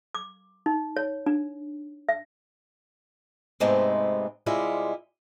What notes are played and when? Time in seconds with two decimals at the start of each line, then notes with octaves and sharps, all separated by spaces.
0.15 D6
0.66 D#4
0.97 C#5
1.26 D4
2.09 E5
3.60 G#2 C3 G#3 A3 B3 C4
4.46 C3 G3 G#3 E4 F4